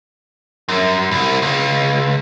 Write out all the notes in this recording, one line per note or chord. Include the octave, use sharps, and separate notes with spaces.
F#2
C2
C#2